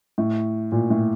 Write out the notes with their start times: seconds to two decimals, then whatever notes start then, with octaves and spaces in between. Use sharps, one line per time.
0.18 A2
0.72 A#2
0.90 A2